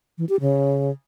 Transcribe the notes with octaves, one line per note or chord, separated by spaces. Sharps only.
E3
G4
C#3